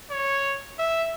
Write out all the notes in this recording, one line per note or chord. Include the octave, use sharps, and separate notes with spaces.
C#5
E5